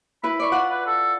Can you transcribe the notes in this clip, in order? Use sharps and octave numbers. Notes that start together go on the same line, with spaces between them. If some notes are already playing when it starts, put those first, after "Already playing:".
E4 B4 B5
D5 C#6
F4 D5 F#5
B4
A4